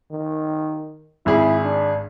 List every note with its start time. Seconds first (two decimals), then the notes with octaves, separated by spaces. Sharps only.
0.11 D#3
1.26 G#1 E4 G#4
1.64 D4